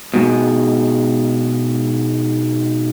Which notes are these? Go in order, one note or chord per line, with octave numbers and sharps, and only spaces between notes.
G#2 B2